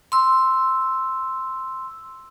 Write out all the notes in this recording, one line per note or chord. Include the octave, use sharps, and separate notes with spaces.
C6 E6